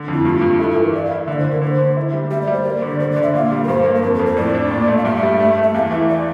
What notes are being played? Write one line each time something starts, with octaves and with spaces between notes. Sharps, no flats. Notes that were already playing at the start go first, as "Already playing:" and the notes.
Already playing: D3
F2 E4
G2 F4
G2
E4 A4
A4
E3
A#4
E4 D5
F5
E4
D3 D5
C5
D3
A#4
D3 C5
D3
E4
G3
G3 E5
D5
G3
C5
A#3 D5
D3
D3 C5
D5
D3
E5
A#2 F5
G3
A#4
G2 C5
A#3
C5
F2 A#4
A4
F2
C5
A2 D5
D4
A#2
A3
F5
G2 E5
G3
A3
A3
E5
E2 F5
E3 E5
D5